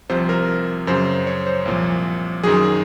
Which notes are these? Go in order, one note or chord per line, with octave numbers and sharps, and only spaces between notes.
C2 C3 F3 C5
A#4
F#2 C#3 F#3 C5
C#5
C5
C2 A#2 F3
F#2 D#3 F#3 G#4